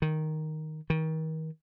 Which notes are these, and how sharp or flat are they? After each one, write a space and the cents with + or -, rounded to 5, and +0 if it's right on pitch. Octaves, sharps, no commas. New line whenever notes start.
D#3 +0
D#3 +35